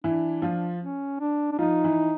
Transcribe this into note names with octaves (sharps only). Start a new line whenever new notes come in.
E3 D4 E4
F3 F4
C#4
D4
D4
F3 D#4 F4
E3 E4